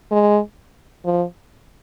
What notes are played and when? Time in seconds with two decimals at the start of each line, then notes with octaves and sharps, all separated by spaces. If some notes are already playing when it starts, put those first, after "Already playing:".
0.11 G#3
1.05 F3